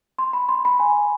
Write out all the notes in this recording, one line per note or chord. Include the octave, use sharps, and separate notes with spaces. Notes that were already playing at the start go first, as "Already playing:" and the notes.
C6
B5
C6
B5
G#5